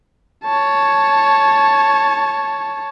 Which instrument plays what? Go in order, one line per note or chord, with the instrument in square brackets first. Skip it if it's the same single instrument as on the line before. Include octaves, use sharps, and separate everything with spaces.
[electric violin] C#5 A5